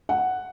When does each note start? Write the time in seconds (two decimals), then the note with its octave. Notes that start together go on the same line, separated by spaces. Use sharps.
0.09 F#5